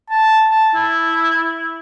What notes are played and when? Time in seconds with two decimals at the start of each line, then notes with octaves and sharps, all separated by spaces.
0.10 A5
0.50 A5
0.75 E4